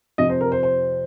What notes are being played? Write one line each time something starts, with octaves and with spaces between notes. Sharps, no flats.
F2 C3 F3 D#5
C5
A#4
C5
C5